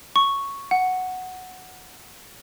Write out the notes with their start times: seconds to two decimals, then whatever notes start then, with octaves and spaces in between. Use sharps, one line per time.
0.16 C#6
0.71 F#5